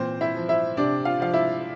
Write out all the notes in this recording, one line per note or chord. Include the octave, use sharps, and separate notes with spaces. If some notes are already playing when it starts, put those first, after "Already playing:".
Already playing: A#2 E3 C4 C5
E4 E5
F3
E4 E5
C3 D4 D5
F4 F5
F3 F5
E4 E5